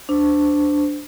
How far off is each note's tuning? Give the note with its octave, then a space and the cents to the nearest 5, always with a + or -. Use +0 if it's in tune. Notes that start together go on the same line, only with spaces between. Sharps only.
D4 +0 C5 -25